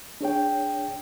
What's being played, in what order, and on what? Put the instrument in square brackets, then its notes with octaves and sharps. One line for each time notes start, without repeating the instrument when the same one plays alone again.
[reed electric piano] D4 G#4 C#5 G5